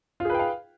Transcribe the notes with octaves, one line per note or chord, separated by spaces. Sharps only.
F4 G#4 B4 F5 G5